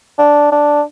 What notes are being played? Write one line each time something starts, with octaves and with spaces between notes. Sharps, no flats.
D4
D4